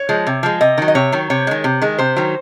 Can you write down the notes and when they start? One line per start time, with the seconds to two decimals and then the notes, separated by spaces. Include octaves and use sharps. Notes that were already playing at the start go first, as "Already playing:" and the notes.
Already playing: C#5
0.09 F3 G#3
0.27 C3
0.43 F3 G#3
0.61 C3 D#5
0.78 D#3 F#3
0.88 D#5
0.95 C3 C#5
1.12 D#3 F#3
1.30 C3 C#5
1.47 D#3 G#3
1.64 C3
1.82 D#3 G#3
1.98 C3 C5
2.16 D#3 F#3